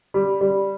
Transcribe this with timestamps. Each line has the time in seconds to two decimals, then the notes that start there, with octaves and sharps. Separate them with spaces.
0.14 G3
0.41 G3